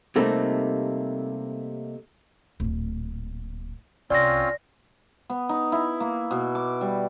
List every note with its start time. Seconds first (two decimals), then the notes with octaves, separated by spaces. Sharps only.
0.16 C3 G3 A3 A#3 D#4 A4
2.60 D1 A#2
4.10 C2 C4 C#4 F4 D5 A#6
5.30 B3
5.49 D#4
5.72 E4
6.00 A#3
6.31 B2
6.55 D6
6.81 G3